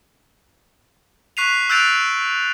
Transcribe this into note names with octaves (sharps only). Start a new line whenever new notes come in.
C#6 F#6 B6 C7 D#7 F7
E6 F#6 G6 A6 D7 F7